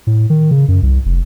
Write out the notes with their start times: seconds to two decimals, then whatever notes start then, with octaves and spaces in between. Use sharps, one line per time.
0.07 A2
0.30 D#3
0.51 C#3
0.68 F#2
0.83 C2
1.06 F1